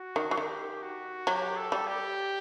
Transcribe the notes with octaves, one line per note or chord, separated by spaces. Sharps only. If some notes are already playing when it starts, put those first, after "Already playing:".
Already playing: F#4
D#3
F#3
D#3 G4
F#4
F#3 G4
A4
G3
G4